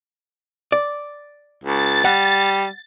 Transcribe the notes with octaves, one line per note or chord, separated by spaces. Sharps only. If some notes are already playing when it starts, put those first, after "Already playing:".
D5
C#2 A6
G3 F#5